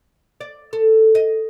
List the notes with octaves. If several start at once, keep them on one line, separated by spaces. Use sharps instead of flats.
D5
A4
D#5